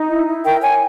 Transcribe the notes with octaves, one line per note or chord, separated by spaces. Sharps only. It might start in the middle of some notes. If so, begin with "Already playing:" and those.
Already playing: D#4
E4
E4
A#4 G5
C#5 G#5